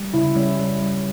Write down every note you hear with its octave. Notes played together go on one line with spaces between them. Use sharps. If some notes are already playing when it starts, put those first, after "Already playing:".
Already playing: G3
C#3 E4
G3 C#4
G3
G3